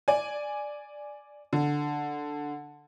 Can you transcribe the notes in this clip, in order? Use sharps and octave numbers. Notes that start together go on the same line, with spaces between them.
D5 G#5
D3